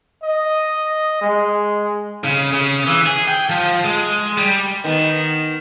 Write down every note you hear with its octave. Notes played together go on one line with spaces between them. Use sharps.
D#5
G#3
C#3
C#3
E3
G#4
G5
F3
G#3
G3
D#3 B3